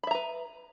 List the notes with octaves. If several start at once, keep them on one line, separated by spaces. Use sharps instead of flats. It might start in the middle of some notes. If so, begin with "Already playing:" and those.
B4 E5 A#5 B5